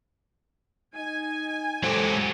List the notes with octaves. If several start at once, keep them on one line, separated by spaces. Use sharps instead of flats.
D#4 G#5
F#3 G#3 A#3 G4 A4 C5